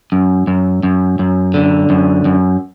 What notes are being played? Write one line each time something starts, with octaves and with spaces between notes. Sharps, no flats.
F#2
F#2
F#2
F#2
D3
F#2
F#2